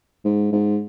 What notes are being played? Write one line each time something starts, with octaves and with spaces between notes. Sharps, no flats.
G#2
G#2